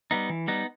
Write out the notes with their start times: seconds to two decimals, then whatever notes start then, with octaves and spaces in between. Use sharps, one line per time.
0.11 G3 B3 D#4
0.29 E3
0.47 G3 B3 D#4